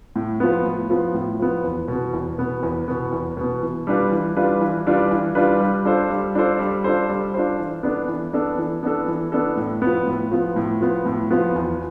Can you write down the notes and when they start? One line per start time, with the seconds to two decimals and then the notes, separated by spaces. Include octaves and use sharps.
0.16 A2
0.40 F3 B3
0.65 A2
0.90 F3 B3
1.14 A2
1.39 F3 B3
1.64 E2
1.88 B2 B3
2.13 E2
2.38 B2 B3
2.63 E2
2.88 B2 B3
3.13 E2
3.37 B2 B3
3.62 E3
3.87 G3 D4 F4 B4
4.12 E3
4.37 G3 D4 F4 B4
4.61 E3
4.87 G3 D4 F4 B4
5.11 E3
5.35 G3 D4 F4 B4
5.60 G3
5.85 D4 F4 A4 C5
6.10 G3
6.35 D4 F4 A4 C5
6.59 G3
6.84 D4 F4 A4 C5
7.09 G3
7.34 D4 F4 A4 C5
7.59 E3
7.83 B3 D4 A4
8.08 E3
8.33 B3 D4 A4
8.58 E3
8.83 B3 D4 A4
9.08 E3
9.32 B3 D4 A4
9.57 A2
9.82 F3 B3
10.07 A2
10.31 F3 B3
10.56 A2
10.81 F3 B3
11.06 A2
11.31 F3 B3
11.56 E2